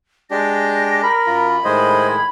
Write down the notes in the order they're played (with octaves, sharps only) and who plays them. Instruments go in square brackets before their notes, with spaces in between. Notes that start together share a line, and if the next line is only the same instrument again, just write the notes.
[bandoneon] G#3 D4 G4 [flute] A#6
[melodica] A#4 [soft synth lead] B5
[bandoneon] F#2 F4
[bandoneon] A2 D#3 G#3 [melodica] C5 D#5 [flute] G#6